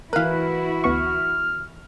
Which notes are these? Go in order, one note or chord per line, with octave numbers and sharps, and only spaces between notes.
E3 E4 F#4 A#4 B4 F5
D2 B3 C#6 F6